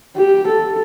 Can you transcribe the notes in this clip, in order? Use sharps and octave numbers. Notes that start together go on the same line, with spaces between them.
G4
A4